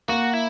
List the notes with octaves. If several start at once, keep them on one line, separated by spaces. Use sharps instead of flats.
A#3 F#4
E4